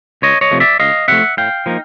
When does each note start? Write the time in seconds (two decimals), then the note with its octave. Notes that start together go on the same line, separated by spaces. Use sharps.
0.22 C#2 C#5 D#5
0.41 C#5 D#5
0.51 C3 F3 A3
0.60 D5 E5
0.80 C#2 D#5 F5
1.08 C3 F3 A3 E5 F#5
1.37 A2 F5 G5
1.66 F3 A#3 D#4